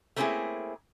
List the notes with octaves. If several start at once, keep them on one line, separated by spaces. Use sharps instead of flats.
A3 A#3 C4 C#4 E4 G#4